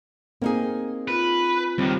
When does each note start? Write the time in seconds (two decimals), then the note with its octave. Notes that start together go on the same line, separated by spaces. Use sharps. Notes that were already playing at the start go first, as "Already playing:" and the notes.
0.42 A#3 C4 D#4 G#4
1.08 F4 B4
1.78 C#2 D#3 G3 C4